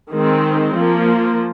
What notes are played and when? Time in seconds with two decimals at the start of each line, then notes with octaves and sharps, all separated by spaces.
0.11 D#3 G#3 C4
0.74 F3 A#3